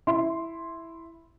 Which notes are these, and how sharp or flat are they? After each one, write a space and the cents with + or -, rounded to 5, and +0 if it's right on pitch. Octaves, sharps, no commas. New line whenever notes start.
E4 +0 C6 +0